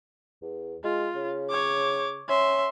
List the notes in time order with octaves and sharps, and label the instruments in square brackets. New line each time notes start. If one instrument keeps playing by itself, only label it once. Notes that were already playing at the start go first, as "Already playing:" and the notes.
[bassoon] E2
[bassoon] G#3 [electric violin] F4
[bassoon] C#3
[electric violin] C#5 D6
[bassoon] C#4 [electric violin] E5 C6